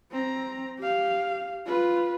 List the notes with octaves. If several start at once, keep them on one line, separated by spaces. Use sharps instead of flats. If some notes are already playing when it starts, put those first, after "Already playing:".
C4 A#5
G4 F5
F4 B4